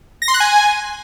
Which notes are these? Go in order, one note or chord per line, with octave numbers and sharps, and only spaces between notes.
A#6
C6
F#6
G#5